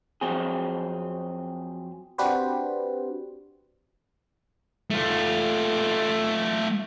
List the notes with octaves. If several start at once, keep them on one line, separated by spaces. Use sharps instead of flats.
F2 F#3 C4 G#4
C4 D4 F#4 G4 B4 C5
A3 F4